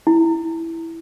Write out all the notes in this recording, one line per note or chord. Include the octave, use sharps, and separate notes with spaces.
E4